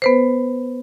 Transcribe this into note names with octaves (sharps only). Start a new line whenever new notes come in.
B3 B4 C5